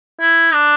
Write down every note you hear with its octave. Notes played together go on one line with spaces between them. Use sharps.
E4
D4